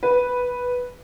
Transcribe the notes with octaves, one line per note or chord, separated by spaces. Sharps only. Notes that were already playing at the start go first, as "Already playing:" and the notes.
B4